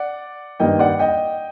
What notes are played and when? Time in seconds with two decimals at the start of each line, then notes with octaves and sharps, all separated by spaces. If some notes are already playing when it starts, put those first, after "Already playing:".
Already playing: D5 F#5
0.60 G2 D#3 G3 A#3 D#5 G5
0.79 D5 F#5
0.99 D#5 G5